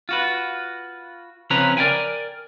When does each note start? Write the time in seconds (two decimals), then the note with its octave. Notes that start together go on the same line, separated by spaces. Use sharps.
0.09 F4 F#4 B4
1.50 C#3 F3 C4 C#4 B4 A#5
1.77 A#4 D5 F5 G5 G#5